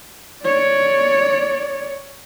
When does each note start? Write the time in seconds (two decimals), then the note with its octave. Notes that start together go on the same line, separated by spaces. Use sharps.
0.43 C#5 D5